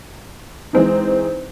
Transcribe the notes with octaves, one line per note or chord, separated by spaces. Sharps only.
E3 G#3 C4 D#4